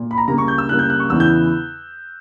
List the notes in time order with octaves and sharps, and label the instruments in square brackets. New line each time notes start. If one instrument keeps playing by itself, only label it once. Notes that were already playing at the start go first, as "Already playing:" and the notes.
Already playing: [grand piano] A#2
B5
A#5
C#3 G3 A#3 A#5
C#6
G6
E6
C#3 G3 A#3 F#6
G6
F#6
C#6
E2 C#3 E3 E6
G6